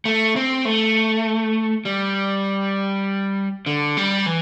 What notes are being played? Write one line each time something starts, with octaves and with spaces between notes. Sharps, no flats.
A3
C4
A3
G3
D3
G3
E3